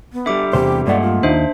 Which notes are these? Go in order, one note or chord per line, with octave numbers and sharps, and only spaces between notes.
B3
D3 G3 E5 D6
E2 C3 G4 C5
G2 A#2 G#3 A3 D5 F#5
F4
D#2 D4 D#4 C5 E5